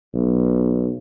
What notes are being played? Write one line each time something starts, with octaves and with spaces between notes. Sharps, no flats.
B1